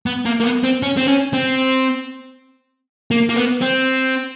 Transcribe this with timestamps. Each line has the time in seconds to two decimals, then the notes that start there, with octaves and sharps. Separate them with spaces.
0.06 B3
0.26 A#3
0.40 A#3
0.44 B3
0.64 C4
0.82 C#4
0.97 C4
1.08 C#4
1.34 C4
3.11 A#3
3.29 A#3
3.36 B3
3.62 C4